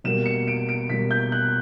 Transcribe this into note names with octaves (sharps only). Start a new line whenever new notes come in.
B2 G3 A#3 E7
C#7
D7
D7
B2 G3 A#3 B6
G6
F#6